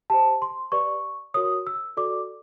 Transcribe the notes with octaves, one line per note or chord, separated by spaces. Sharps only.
G4 C5 A5
C6
G4 B4 D5 C#6
F#4 A#4 C#5 D#6
E6
F#4 A4 D5 D6